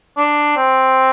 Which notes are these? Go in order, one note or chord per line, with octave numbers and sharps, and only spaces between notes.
D4
C4